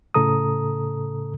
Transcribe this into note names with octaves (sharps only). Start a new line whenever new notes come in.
A2 C#3 A4 A#5 D#6